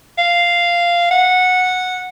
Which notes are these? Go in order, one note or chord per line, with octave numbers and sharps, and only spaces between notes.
F5
F#5